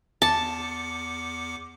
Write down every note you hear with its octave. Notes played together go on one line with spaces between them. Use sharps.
E2 A5 D6 C#7